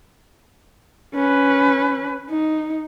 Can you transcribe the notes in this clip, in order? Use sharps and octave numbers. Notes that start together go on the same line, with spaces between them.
C#4 B4
D#4